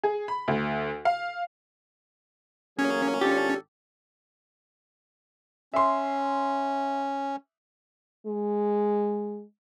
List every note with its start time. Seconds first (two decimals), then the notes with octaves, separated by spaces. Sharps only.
0.04 G#4
0.28 B5
0.48 D2
1.05 F5
2.79 A1 F#3 A#3 C#4 G#4
3.21 G#1 D4 F4 G4 A4
5.74 C#4 E5 C6
8.27 G#3